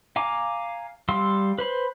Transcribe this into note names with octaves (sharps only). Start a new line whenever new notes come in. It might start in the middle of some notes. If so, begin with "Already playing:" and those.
F5 G#5 A#5 D6
G3 F5 C6 E6
B4 C5 B5